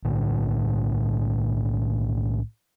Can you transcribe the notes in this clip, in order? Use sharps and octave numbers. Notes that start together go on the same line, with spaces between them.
B1 A2 D3